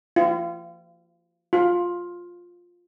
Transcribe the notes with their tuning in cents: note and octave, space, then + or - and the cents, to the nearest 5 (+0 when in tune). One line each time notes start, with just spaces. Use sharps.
F4 -35
F4 +10